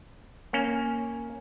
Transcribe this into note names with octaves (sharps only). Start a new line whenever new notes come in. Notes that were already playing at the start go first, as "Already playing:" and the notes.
A#3 C#4